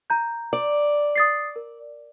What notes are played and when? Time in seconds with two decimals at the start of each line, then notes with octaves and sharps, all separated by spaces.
0.10 A#5 G6
0.53 D5
1.16 D#6 A6 C7
1.56 A#4